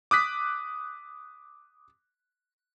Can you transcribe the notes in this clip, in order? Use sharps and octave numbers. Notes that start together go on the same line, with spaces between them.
D6 D#6 F#6 B6